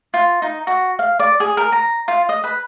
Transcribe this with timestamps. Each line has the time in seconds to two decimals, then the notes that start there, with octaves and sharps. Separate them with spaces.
0.14 F4
0.42 D#4
0.67 F#4
0.99 F5
1.19 D5
1.40 G#4
1.57 A#4
1.72 A#5
2.08 F4
2.29 D#5
2.44 B4